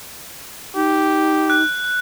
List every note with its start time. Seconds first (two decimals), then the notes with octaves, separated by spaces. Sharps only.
0.75 D#4 G4
1.50 F#6